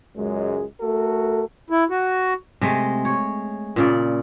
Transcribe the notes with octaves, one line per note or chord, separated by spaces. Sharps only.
C#2 F#2 G#3
A3 F#4 A4 A#4
E4
F#4
C3 G#3 A3
C#5
A#2 C#3 D5